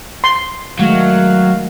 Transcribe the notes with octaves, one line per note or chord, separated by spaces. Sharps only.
C6
D#3 F#3 G#3 A3 F5